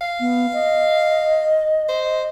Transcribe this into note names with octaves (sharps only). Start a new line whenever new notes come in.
F5
B3
D#5
C5